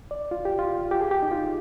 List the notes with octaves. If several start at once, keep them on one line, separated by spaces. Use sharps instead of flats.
D5
F4
G4
F4
G4
G#4
G4
D#4
F4